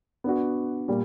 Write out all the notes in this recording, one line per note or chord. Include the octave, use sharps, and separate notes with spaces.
B3 D4 F#4
A#2 G3